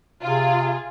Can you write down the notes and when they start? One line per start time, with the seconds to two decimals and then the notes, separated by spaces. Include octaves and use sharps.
0.23 C3 F4 G#4